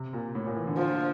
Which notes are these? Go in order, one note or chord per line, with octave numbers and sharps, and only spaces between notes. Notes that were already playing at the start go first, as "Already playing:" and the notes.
Already playing: C3
A#2
A2
A#2
E3
D3
F3